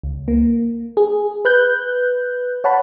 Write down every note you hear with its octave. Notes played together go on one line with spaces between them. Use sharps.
C#2
A#3
G#4
B4 F#6 G6
C#5 F#5 A5 B5